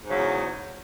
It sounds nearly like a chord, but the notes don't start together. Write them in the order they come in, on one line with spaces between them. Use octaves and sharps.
G#2 F#3 C#3 E2